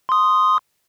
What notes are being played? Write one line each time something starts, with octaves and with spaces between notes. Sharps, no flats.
C6 D#6